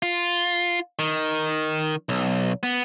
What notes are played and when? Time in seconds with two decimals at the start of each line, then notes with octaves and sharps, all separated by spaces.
0.02 F4
0.99 D#3
2.09 B1
2.63 B3